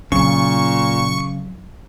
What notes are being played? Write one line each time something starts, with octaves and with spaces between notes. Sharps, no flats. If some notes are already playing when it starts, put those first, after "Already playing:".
A#2 C#3 F#3 C#6 C#7